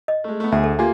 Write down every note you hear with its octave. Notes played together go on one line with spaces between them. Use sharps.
D#5
G#3 A3
A3 B3
D2 G#4 E5
A4
A#3 F4 G4 G#5